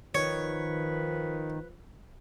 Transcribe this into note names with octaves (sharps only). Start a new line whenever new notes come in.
D#3 F3 B4 C#5